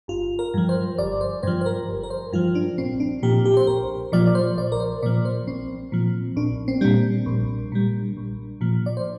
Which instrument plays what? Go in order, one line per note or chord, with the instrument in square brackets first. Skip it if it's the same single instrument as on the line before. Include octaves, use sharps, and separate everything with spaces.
[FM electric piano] G1 F4
A#4
G2 F3
C5
G1 D5
C5
G2 F3 C5
C5
A#4
G1
A#4
C5
G2 F3 F4
D4
A#1 C4
D4
A#2 F3 G4
G4
C5
A#1 A#4
A#2 F3 D5
D5
C5
A#1 D5
A#4
C5
A#2 F3 D5
C5
A#1 C4
A#2 F3
A#1 D4
C4
A#2 G3 D4
A#1
A#2 G3
A#1
A#2 F3
D5
C5